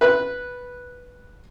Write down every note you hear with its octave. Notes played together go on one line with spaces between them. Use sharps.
B4 F#6